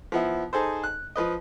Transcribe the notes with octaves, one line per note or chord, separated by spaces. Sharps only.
F3 B3 E4
D#4 G#4 A4 C5
F#6
F3 B4 D#5